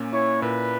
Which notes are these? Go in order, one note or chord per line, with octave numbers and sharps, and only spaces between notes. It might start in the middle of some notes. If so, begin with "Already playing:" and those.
Already playing: A#2 A#3 C#4
E4 C#5
A#2 B4